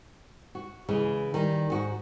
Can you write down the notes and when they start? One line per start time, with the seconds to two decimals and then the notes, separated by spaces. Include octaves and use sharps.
0.55 F#4
0.89 C#3 E3 G#3
1.34 D#3 G3
1.70 G#2 F#4